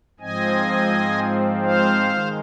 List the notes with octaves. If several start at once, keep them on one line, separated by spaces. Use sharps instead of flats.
G#2 F3 C4 D#5 G#5
C5 F5
D#3 G#3